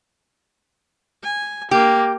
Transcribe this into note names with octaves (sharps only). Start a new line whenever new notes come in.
G#5
A#3 G4